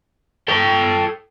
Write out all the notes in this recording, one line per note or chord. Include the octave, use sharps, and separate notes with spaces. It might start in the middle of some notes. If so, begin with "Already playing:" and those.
A4 G5